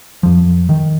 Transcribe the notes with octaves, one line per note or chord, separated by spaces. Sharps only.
F2 F3
D#3